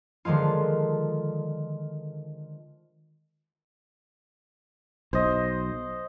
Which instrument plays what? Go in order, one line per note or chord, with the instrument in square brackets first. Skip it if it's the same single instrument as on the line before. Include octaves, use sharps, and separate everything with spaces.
[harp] D3 D#3 F3 G#3 F4
[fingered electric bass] B1 [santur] C5 D#5